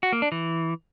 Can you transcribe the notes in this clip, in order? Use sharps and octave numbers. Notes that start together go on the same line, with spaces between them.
F#4
A#3
D4
E3